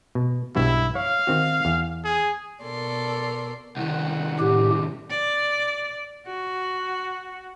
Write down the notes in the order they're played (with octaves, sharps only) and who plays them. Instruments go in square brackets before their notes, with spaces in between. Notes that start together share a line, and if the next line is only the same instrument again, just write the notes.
[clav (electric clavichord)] B2
[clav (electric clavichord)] B1 G2 F#4 [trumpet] E4
[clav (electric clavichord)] C#5 [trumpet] F5
[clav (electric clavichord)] D#3 C4 F#4
E2
[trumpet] G#4
[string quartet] B2 A4 A#4 D5 C6
[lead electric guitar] C2 D#3 [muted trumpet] F#5
[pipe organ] A2 G4
[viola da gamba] D5
F#4